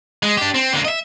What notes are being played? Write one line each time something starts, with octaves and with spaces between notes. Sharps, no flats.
G#3
D4 G4
C4
D3 A#3
D#5 E5